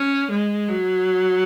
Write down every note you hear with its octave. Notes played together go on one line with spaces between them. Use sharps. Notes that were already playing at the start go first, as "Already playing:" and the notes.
Already playing: C#4
G#3
F#3